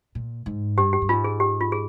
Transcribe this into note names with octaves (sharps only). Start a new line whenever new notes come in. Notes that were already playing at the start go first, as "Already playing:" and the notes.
A#2
G#2
G2 G4
G4
G2
G#2 F4
G#4
G4
F4
G#4